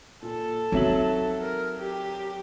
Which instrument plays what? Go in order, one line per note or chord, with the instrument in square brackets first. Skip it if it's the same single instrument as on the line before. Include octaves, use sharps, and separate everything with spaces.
[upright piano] A#2 [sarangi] A4
[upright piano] F#3 E5 F#7 [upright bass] C4 D#4
[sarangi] A#4
G4